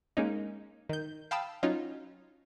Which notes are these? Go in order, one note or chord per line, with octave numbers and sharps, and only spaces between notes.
G#3 A#3 C#4 D#4
D#3 G6
F5 G5 A5 B5 D#6 E6
F#3 C#4 D#4 F4